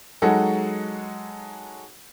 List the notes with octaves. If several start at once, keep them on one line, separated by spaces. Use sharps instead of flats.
F#3 G#3 D#4 F#4 G#4 A4